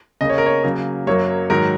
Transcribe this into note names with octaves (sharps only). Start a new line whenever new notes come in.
C#3 A#3 D#5
C#5
A#4
C#5
C#3 F#3 A#3
F#2 F#3 A#3 C#5
G#2 D#3 F#3 A#4